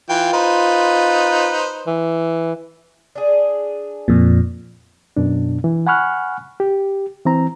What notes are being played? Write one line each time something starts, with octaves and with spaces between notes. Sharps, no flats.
E3 F4 G5
D#4 B4 C5
E3
D4 G#4
F2 A#2
F#2 B2 D4
E3
F#5 G#5 B5 C#6 F6 F#6
G4
E3 C4 A#5